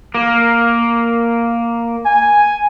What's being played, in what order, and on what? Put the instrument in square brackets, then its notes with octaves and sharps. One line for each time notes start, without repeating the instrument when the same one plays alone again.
[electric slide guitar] A#3
[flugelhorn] G#5